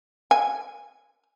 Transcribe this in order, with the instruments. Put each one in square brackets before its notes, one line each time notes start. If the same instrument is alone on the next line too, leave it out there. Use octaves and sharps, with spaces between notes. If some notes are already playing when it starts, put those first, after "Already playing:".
[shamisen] G#5